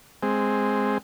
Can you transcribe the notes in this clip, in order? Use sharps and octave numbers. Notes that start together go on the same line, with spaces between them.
G#3 C4